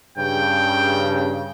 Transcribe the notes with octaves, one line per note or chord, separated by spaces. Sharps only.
G2 C#3 G5